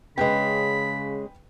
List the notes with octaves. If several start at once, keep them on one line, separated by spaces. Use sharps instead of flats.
C#3 G#3 C#4 B4 G5 B5